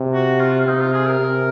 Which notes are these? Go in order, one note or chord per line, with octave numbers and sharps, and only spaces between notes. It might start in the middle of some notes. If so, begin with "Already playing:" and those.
Already playing: C3
F#4
F4
F4
C3 D#4
F4
G#4
A#4
C3